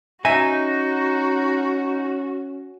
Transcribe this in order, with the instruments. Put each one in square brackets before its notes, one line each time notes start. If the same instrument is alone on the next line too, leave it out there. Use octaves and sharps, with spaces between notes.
[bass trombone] C#4 [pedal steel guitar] D#4 [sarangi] F#4 [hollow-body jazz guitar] E5 G#5